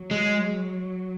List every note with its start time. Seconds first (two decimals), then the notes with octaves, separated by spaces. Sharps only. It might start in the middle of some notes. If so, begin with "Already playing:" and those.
Already playing: F#3
0.11 G#3